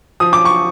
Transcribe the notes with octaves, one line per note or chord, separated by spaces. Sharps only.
F3 D#6
D6
C#6